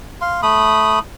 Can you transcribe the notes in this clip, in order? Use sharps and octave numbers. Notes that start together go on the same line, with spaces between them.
F5 C6
A3 B5 D#6